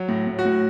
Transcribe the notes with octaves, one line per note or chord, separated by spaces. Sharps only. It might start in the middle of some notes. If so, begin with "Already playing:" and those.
Already playing: F#3
A2
A2
F#4
A2